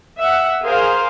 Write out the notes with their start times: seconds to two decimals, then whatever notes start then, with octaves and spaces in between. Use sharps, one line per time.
0.19 E5 F#5
0.63 G#4 A#4 C5 F5